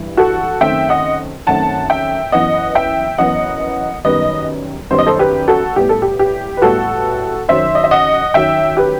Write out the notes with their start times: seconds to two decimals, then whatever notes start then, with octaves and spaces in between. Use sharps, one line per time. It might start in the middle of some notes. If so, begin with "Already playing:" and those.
Already playing: G2 E3 G3
0.17 F#4 A4
0.61 F#2 D#3 A3 C4 E5 G5
0.89 D#5 F#5
1.47 F#2 D#3 A3 C4 F#5 A5
1.90 E5 G5
2.32 F#2 E3 B3 D#5 F#5
2.75 E5 G5
3.18 F#2 E3 B3 D#5 F#5
4.04 F#2 D#3 G3 B3 B4 D#5
4.91 F#2 D#3 G3 B3 C5
4.99 D#5
5.07 A4 C5
5.19 G4 B4
5.48 F#4 A4
5.76 A2 G3 B3 G4
5.89 A4
6.02 G4
6.19 G4
6.57 B4
6.62 A2 G3 B3 F#4 A4
7.49 F#2 D#3 F#3 C5 E5
7.75 D#5
7.84 E5
7.91 D#5 F#5
8.34 F#2 D#3 F#3 E5 G5
8.77 G4 B4